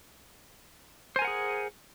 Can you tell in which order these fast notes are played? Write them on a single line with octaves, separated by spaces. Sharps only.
C5 G#5 A#4 F#5 G#4